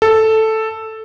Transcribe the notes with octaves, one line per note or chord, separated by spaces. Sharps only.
A4